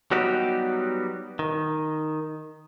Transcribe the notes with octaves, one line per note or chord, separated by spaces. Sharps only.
F#3 G3 B3 D#4 F#4 G4
D#3